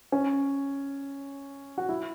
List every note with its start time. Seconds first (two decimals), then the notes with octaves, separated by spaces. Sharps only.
0.12 C#4
1.78 F#4
1.89 E4